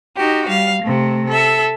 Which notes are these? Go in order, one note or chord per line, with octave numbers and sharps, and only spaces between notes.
D#4 F#4 G4
G3 F5
C3 A3
A4 E5